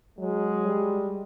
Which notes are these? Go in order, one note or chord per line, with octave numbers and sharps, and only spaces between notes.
F#3 G#3
G3